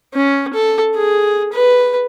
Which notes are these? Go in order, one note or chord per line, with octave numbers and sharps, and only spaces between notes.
C#4
A4
G#4
B4